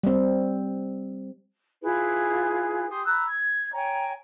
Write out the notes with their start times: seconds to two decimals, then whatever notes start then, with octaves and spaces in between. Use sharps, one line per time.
0.03 G3 C4
1.81 E4 F4 G#4 B4
2.88 G4 G#5 C6 D#6
3.05 A#5 B5 E6 F#6
3.26 G#6
3.73 C#5 G5 G#5 A#5